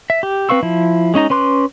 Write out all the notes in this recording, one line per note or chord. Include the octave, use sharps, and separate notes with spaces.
E5
G4
C4 B4 F5 C#6 E6
F3 E4
G#3 C#4 D#4 A#5
C#4 B4 C6 D6 F#6